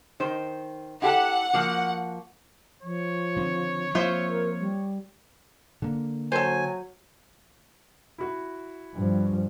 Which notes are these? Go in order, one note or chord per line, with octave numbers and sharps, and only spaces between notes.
D#3 C5
E4 G4 A4 F#5
F3 A#3 F#4
F3 C#5
D3 D#3 C4
F3 A#3 C4 F4 C5 E5
A#4
G3
D3 A#3
F#3 A4 C5 G#5
E4 F#4
G2 F3